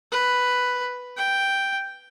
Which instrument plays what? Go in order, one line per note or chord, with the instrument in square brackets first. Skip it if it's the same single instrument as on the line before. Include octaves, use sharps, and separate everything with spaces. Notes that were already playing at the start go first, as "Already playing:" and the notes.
[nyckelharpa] B4
G5